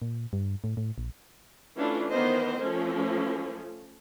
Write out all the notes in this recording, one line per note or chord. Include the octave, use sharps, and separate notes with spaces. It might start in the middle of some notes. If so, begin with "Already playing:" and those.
A#2
G2
A2
A2
A#1
E3 A3 C#4 D4 F4
D#3 E3 B3 A#4 C5 D#5
F3 A3 C#4